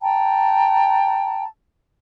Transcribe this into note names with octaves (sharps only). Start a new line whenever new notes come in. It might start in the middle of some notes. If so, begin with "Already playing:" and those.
G5 A5 A#5